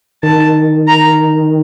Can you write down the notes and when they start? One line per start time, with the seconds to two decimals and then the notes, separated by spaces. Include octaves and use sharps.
0.23 D#3 A5
0.88 A#5